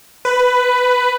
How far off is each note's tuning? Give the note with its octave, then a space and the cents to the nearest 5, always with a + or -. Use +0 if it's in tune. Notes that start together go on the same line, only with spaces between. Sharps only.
B4 +10